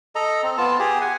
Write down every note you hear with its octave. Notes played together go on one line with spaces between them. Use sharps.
A4 D#5 A#5
C4
B3 F4 A5
G4 G#4
F#5 G#5